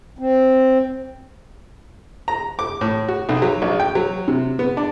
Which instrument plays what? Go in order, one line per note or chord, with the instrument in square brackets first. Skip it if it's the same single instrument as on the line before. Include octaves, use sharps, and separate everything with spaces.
[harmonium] C4
[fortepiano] A#5
D6
A2
F#4
B1
F#3
A#1
G5
F#3
C3
B3
D4